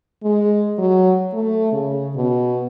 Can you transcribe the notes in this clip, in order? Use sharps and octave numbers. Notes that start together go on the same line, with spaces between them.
G#3
F#3
A3
C#3
B2